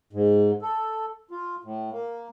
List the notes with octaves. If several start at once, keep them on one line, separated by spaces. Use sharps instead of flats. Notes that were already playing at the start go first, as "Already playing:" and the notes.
G#2
A4
F4
A2
A#3